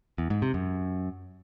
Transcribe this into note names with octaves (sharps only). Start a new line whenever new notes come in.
E2
G#2
C3
F#2